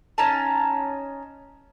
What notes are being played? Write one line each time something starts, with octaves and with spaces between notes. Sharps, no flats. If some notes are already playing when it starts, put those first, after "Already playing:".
C#4 D#4 A5